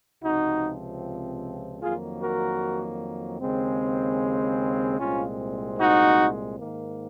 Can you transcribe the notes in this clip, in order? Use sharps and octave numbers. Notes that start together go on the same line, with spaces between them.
C#2 C3 F3 C4 D#4 F#4
F2 D#3 F#3 A#3 F4 G#4
F#4 A#4
D#2 C#3 G#3 C4
C2 A#2 G#3 C4 C#4 F4
D#4 F#4
G#2 D#3 A#3